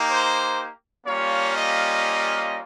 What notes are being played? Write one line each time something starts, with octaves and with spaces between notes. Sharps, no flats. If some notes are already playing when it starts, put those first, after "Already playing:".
Already playing: A#3 D#4 G4
C5
G3 A#3 C#4 F4 C#5
D#5